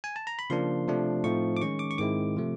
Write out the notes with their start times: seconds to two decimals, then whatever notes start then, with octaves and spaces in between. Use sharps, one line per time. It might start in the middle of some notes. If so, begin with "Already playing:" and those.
0.04 G#5
0.16 A5
0.27 A#5
0.39 B5
0.50 C#3 F3 A#3 D4 C6
0.88 C3 F3 A3 D4
1.24 A2 F3 A3 C4 D#4 C#6
1.57 D6
1.61 D#3 G#3 C#4 C#6
1.79 D6
1.91 C#6
1.98 G#2 D#3 G#3 C4 E4 D6
2.37 C3 F3 A3